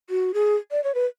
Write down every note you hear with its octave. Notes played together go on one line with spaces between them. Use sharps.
F#4
G#4
D5
C#5
B4